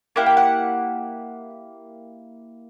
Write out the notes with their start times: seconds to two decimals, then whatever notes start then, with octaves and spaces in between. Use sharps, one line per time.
0.16 A#3 E4 G4 F#5
0.26 G5
0.37 F#5